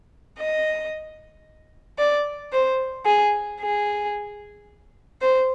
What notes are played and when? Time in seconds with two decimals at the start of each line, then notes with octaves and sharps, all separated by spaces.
0.37 D#5
1.98 D5
2.51 C5
3.05 G#4
3.60 G#4
5.20 C5